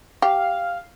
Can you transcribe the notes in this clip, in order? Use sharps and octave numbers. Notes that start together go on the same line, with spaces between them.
G4 F5